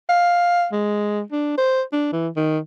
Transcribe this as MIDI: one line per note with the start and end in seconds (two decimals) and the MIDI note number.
0.09 0.67 77
0.72 1.21 56
1.32 1.55 62
1.58 1.82 72
1.93 2.08 62
2.12 2.28 52
2.36 2.59 51